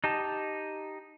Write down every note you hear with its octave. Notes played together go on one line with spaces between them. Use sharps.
D#4 G4 A5